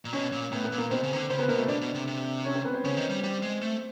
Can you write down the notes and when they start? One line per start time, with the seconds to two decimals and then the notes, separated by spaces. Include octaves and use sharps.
0.05 A#2
0.13 B2 C#4 C#5
0.32 A#2
0.52 A2 B3 B4
0.64 B3 B4
0.72 A#2
0.78 A#3 A#4
0.90 B2 C4 C5
1.03 C#3
1.13 D#3
1.16 D3
1.29 C#3 C4 C5
1.38 B3 B4
1.48 B2 A#3 A#4
1.58 A3 A4
1.67 B2 D4 D5
1.81 B2
1.94 C3
2.07 C3
2.45 C#4 C#5
2.55 C4 C5
2.65 B3 B4
2.74 C4 C5
2.84 C#3 C#4 C#5
2.97 D#3
3.10 G3
3.23 G3 C4 C5
3.43 G#3
3.62 A3